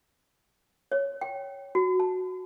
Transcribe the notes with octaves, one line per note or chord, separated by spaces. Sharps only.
C#5
G5
F#4
A5